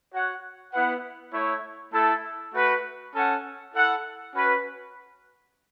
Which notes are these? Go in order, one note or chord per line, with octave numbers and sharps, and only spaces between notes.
F#4 C#5 F#5
B3 E4 B4 F#5
A3 E4 C#5
A3 E4 A4
A3 F#4 B4
C#4 A4 F#5
E4 A4 F#5
C#4 F#4 B4